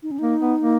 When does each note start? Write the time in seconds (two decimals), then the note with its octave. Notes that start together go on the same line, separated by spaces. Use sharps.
0.03 D#4
0.11 C#4
0.19 A#3 D#4
0.41 B3
0.60 A#3